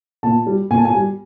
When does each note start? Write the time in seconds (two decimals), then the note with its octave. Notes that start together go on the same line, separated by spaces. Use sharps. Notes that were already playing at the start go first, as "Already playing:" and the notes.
0.23 A#2 A5
0.47 G3
0.71 A#2 G#5
0.78 A5
0.85 G#5
0.95 G3